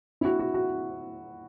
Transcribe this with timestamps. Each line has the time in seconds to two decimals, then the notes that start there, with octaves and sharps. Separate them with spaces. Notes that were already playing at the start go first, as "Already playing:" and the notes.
0.21 E4
0.25 F#4
0.39 F#4
0.54 F#4